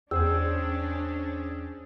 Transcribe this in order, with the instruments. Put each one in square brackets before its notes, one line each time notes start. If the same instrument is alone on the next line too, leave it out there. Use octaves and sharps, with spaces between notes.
[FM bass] E2 [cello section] C#4 D4 [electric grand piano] G#4 C5 G5 [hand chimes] E6